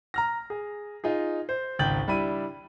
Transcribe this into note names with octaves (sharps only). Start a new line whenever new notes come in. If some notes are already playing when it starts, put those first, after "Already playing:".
A#5 F6 A#6
G#4
D#4 F4 G#4
C5
G#1 C#2 G5 G6 A6 F#7
G3 D4 E4 B5 D#7